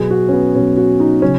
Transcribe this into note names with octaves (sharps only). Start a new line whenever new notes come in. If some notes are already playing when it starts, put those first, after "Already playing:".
Already playing: B2 F#3 G#4
F#4
C#4
B3
B2 F#3 C#4
F#4
D#4
C#3 F#3 C#4